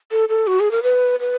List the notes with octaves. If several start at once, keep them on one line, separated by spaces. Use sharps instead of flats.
A4
A4
F#4
G#4
A#4
B4
B4